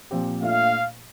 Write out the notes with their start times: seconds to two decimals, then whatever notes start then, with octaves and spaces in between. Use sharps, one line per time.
0.11 A#2 F3 C4 G4
0.42 A#2 A3 D4 F4 F5